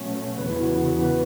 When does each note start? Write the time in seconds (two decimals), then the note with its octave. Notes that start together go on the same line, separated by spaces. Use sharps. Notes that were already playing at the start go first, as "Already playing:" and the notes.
Already playing: B2 F#3 A3 C#4
0.38 E2 C#3 E3 B3 B4
0.50 E4
0.62 F#4
0.75 E4
0.86 F#4
1.02 B4